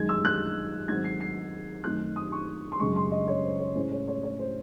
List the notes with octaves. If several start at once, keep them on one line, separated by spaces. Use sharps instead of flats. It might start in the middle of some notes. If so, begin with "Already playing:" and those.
Already playing: F#2 D#3 G#3 G#6
E6
F#6
G#2 D#3 F#3 C4 G#6
C7
C7
F#2 D#3 A3 C4 F#6
D#6
C#6
C6
F#2 C#3 G#3 C#6
C6
D#5
C#5
C5
C#5
A2 G#3 C#4 C5
C#5
C#5
C#5
C5